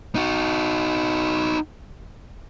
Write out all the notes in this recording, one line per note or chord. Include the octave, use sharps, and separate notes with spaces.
D#4 F#4